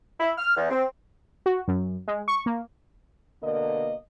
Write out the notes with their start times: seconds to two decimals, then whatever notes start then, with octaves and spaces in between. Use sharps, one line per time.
0.20 E4
0.38 F6
0.57 E2
0.70 C4
1.46 F#4
1.68 F#2
2.08 G#3
2.28 C#6
2.46 A#3
3.42 B2 D3 A#3 A#4 D#5